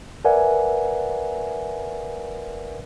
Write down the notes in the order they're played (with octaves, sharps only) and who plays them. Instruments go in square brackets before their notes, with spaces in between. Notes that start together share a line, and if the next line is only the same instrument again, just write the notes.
[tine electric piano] A#4 B4 D5 E5 F#5 G#5